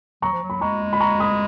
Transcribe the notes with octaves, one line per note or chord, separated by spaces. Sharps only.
F#3 A#5 C#6
F3
F#3
B5
G#3 A#5 C#6
B5
A#5 C#6
B5 D#6